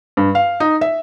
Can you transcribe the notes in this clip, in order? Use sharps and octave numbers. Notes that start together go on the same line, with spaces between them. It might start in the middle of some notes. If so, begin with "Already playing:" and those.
G2
F5
D#4
E5